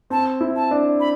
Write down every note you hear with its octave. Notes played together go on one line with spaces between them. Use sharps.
C4 A5
E4
A5
D4
B5